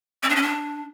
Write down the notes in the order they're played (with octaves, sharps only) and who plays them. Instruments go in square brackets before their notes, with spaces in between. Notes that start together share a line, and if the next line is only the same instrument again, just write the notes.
[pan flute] C4
D4
C#4
D4